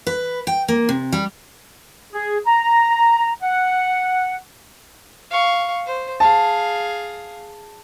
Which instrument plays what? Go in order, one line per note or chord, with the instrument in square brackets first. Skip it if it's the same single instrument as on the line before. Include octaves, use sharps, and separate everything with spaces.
[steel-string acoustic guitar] B4
G5
A#3
C3
G3
[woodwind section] G#4
A#5
F#5
[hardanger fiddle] F5 C#6
C5
[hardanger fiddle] G#4 F5 [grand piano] A5